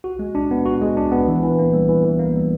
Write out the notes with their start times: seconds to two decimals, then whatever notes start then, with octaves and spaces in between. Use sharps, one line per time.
0.04 F#4
0.19 G#3
0.35 D4
0.51 B3
0.66 F#4
0.81 G#3
0.97 D4
1.11 B3
1.28 E3
1.43 E3
1.59 A#3
1.73 G3
1.89 E3
2.05 E3
2.19 A#3
2.36 G3